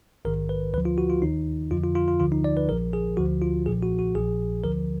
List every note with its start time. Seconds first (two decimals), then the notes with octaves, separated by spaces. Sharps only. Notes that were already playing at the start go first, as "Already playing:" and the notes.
0.25 A#1 G#2 D#3 A#4
0.49 B4
0.73 D2 D3 F3 B4
0.85 F4
0.98 F#4
1.10 F4
1.22 D#2 D#3 D#4
1.71 F2 D3 F3 F4
1.84 F4
1.95 F4
2.08 F4
2.20 D2 D3 F3 F4
2.32 D#4
2.44 D5
2.57 B4
2.68 A#1 A#2 F3 A#4
2.93 G#4
3.17 D2 D3 F3 F#4
3.42 F4
3.66 B1 A#2 F3 G#4
3.82 F#4
3.99 F#4
4.15 A#1 A#2 F3 G#4
4.64 D2 D3 F3 A#4